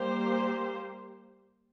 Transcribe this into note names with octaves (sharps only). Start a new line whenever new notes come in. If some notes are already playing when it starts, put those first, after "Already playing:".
Already playing: G3 A#3 G4 C5